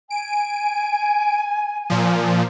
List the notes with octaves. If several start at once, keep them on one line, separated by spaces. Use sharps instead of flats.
G#5 D7
A#2 F3